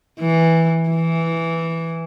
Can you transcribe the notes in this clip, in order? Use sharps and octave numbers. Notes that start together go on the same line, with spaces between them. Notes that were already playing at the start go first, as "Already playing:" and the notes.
E3
E3